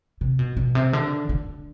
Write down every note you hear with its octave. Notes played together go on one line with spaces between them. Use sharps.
C3
B2
B2
C3
D3
D3